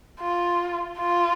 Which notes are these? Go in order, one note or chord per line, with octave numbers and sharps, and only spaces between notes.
F4
F4